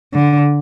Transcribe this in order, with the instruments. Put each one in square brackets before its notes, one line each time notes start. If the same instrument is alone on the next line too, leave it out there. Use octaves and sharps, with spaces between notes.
[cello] D3